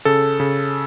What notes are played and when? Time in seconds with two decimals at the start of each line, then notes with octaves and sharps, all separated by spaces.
0.05 C#3 A4
0.40 C#3